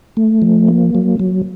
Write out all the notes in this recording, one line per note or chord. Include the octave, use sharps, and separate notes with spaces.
A3
F3
A#3
F#3
F#3